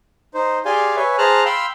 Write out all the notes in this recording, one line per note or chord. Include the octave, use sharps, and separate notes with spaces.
D#4 C5
G4 G#4 D5 F5 G#5 C6
B4 C#5 E5 G#5
G#4 C5 A5 A#5 F6 F#6
F5 G5 B5 C6 E6